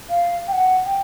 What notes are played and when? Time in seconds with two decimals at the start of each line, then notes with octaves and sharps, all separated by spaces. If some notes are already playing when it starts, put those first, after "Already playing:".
0.10 F5
0.48 G5
0.53 F#5
0.86 G5